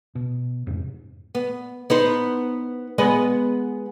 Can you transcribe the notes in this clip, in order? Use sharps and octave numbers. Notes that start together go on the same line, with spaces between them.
B2
F2 G#2 C3
B3
B3 D#4 C5
G#3 B3 D#5